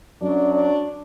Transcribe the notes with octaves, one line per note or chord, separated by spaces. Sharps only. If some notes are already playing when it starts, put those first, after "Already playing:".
F#2 F#3 D4
D4